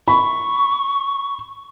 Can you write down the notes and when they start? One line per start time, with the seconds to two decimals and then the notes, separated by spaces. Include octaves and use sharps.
0.08 B5 C#6